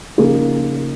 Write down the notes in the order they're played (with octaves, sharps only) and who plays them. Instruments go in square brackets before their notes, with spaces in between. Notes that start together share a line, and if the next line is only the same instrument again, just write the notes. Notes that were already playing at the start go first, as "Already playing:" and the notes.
[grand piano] C#3 F3 A#3 D#4 G#4